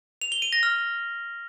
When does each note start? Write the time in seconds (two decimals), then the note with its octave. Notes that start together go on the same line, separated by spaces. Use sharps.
0.22 F7
0.32 G7
0.42 D#7
0.53 A#6
0.63 F6